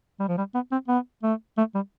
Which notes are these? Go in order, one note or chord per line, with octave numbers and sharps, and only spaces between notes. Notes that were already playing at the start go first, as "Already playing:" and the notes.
G3
F3
G3
B3
C4
B3
A3
A3
G3